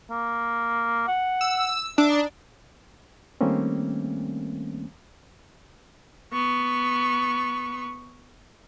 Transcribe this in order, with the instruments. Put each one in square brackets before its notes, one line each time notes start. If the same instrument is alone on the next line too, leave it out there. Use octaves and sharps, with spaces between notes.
[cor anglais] A#3
F#5
[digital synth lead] E6
[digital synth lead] D4 [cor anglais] E5
[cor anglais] D#4
[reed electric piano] D#3 G3 A3 A#3 C4 C#4
[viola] B3 C#6